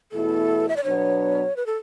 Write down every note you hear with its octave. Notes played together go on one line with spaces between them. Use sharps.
E2 B2 A3 E4 A4
E5
D5
B2 F#3 B3 D4 C#5
B4
A4